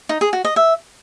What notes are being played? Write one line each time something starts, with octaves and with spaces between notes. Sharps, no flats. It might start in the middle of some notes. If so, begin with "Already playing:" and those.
D#4
G#4
F#4
D#5
E5